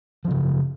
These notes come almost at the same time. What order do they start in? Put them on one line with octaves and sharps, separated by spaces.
F3 F#2 C#3